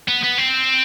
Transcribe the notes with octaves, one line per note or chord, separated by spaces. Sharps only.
B3
B3
C4